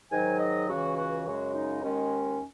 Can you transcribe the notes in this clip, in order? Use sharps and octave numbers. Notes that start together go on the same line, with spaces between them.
G#2 D#3 F#3 G#5
D#5
C#2 C#3 E3 F#4
F#4
F#2 C#3 G#3 F#4
D#4
D#2 D#3 G#3 C#4